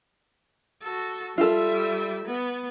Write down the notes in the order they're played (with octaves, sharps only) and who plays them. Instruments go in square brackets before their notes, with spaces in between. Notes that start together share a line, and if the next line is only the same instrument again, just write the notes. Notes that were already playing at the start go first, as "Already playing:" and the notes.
[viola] F#4 A4
[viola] G3 E5 [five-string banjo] F4 A4
[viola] B3